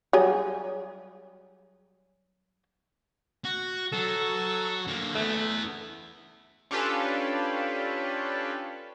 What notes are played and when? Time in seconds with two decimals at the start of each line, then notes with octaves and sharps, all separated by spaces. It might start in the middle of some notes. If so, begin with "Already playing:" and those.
0.13 F#3 G3 G#4
3.45 F#4
3.93 F#3 A4
4.87 D3 A#3
5.15 A3 B3 E4
6.71 C#4 D4 F4 G4 A4 B4